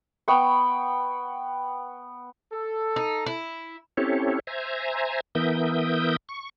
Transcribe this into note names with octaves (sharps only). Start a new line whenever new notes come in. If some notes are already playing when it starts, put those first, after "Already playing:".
B3 G5 C#6
A4
D#4
E4
C4 C#4 E4 G4 A4 C#5
C5 E5 G#5 A#5
E3 B3 A#4 E5 D#6 G6
C#6